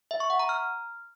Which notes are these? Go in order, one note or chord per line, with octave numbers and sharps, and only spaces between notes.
E5
C#6
F#5
A#5
F6